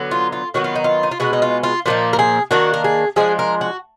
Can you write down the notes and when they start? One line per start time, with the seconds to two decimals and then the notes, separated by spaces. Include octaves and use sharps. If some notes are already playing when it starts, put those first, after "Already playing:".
Already playing: D3 F#3 B3
0.11 F4
0.32 F4
0.54 D#3 F#3 B3 F#4
0.64 F4
0.75 D#4
0.84 F4
1.03 D#4
1.11 F4
1.20 B2 G#3 B3 F#4
1.33 D#4
1.42 F4
1.63 F4
1.86 A#2 F3 A#3 D#4 F#4
2.13 A#4
2.19 G#4
2.51 D#3 A#3 D4 F#4
2.74 A#4
2.84 G#4
3.16 F3 G#3 D4 G#4
3.39 A#4
3.61 F#4